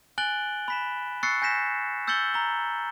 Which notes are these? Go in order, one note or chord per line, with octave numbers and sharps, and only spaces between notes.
G#5 F#6 A6 D7 F#7 G7
B5 B6 E7
C#6 E6 F#6 A6 C7 C#7
G#5 G6 A#6 B6 E7
E6 G6 A6 C#7 F#7 G7
A#5 G7